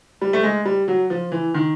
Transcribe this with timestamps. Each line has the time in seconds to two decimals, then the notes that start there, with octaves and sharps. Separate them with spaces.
0.21 G3
0.33 A3
0.43 G#3
0.65 G3
0.88 F#3
1.10 F3
1.32 E3
1.54 D#3